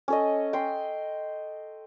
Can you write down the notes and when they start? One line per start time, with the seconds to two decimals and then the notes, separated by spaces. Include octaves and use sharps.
0.08 C#4 A4 D#5
0.53 G5 C6